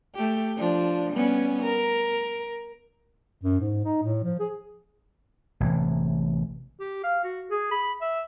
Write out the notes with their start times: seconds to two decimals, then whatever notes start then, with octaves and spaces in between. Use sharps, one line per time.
0.15 A3 G4
0.56 F3 D4
1.13 G3 B3 C#4
1.63 A#4
3.43 F#2
3.61 G#2
3.85 D#4
4.03 A2
4.24 F3
4.40 G#4
5.60 A1 C3 E3
6.80 G4
7.04 F5
7.24 F#4
7.51 G#4
7.71 B5
8.01 E5